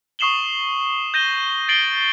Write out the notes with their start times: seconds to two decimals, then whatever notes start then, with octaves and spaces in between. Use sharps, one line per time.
0.19 C#6 D#6 C7 E7 F#7 G7
1.14 G6 A#6 D#7 G7
1.69 A6 C7 D7 F#7 G7